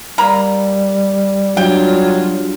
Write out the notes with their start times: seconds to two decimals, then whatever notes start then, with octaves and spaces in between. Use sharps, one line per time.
0.18 G3 A#3 A#5 B5
1.57 G2 F#3 F4 G5